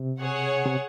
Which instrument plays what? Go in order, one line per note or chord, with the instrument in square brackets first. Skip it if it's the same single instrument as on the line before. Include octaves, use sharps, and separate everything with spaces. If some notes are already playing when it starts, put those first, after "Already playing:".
Already playing: [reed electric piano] C3
[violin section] G#4 C#5 F#5
[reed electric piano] C3